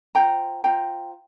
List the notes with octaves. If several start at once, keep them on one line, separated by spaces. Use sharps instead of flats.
F4 C5 G5 A#5
F4 C5 G5 A#5